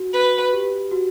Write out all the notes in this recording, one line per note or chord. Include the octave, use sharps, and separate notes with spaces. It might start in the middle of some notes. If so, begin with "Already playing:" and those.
Already playing: F#4
B4
G4
F#4